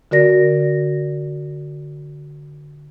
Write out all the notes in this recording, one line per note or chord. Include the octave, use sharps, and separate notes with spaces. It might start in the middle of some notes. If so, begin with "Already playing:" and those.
D3 F#4 A#4 D5 A#6